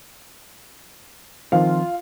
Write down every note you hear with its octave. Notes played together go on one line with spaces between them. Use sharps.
D#3 F3 C4 F4 F5